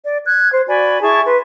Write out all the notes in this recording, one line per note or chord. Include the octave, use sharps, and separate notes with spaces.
D5
F#6 G#6
C5
F#4 D5 G#5 B5
E4 G#4 A5 C#6
B4 C6